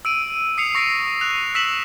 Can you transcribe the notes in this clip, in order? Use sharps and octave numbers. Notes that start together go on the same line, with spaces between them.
E6 D7 D#7
D#6 C7 C#7 F7
C#6 A#6 C7 D7
F#6 F7
E6 B6 E7 F#7